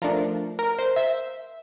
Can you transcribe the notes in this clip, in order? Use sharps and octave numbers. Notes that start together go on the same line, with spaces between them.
F3 A3 D4 A#4
A#4
C5
E5